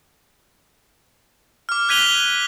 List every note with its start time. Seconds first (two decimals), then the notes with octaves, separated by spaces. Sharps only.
1.69 D6 F6
1.89 F#6 G#6 B6 D#7 F7 G7